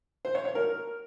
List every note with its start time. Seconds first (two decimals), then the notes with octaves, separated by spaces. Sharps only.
0.25 C5
0.35 C#5
0.45 C#5
0.55 A#4